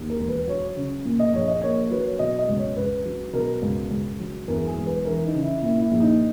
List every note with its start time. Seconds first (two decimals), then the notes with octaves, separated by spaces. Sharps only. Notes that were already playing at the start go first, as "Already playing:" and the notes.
Already playing: D#2
0.09 A#4
0.19 E1
0.28 B4
0.47 F#3 C#5
0.67 C#5
0.76 C#3
1.05 A#2
1.19 D#5
1.33 A#1 C#5
1.48 D#5
1.62 A#3 C#5
1.90 F#3 B4
2.06 C#5
2.19 B2 D#5
2.38 D#5
2.48 C#2
2.57 C#5
2.76 C#2 B4
3.05 F#3
3.33 B2 A#4
3.62 C#2
3.90 C#2
4.20 F#3
4.48 E2 A#4
4.67 G#4
4.77 E1
4.86 B4
5.05 E3 A#4
5.24 D#4
5.34 C#3
5.43 E4
5.62 A#2 E4
5.81 E4
5.91 A#1
6.00 D#4